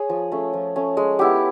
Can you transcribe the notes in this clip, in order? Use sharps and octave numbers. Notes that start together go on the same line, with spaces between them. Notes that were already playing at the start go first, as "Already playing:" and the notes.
Already playing: G#4 C#5
F3
A3 C#4
F3
A3 C#4
G#3
B3 E4 G4